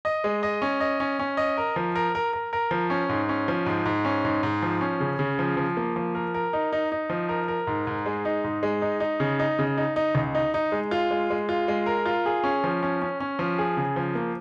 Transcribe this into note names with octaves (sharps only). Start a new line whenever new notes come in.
D#5
G#3
D#5
C#4
D#5
C#4
C#4
D#5
A#4
F3
A#4
A#4
A#4
A#4
F3
C#4
G#2
C#4
F3
G#2
G#2
C#4
G#2
G#2
F3
C#4
C#3
C#3
F3
F3
A#3
F3
A#4
A#4
D#4
D#4
D#4
F3
A#4
A#4
G#2
G#2
G#3
D#4
G#2
G#3
D#4
D#4
C#3
D#4
C#3
D#4
D#4
C#2
D#4
D#4
G#3
F4
G#3
G#3
F4
G#3
A#4
F4
G#4
C#4
F3
C#4
C#4
C#4
F3
G#4
C#3
F3
A#3